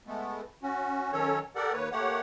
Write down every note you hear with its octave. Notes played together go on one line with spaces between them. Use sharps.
G#3 A3 B3
C#4 F#4
D#3 F#3 C#4 A4 C#5
G4 A4 A#4 D5 F#5
D#2 A#3 B4 C#5
A3 A#3 G4 C#5 F#5